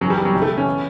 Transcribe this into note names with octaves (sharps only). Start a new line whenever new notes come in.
F#2 E3 F#3 G3
G3
F#3
C#2 B2 G3
A3
C#4
E3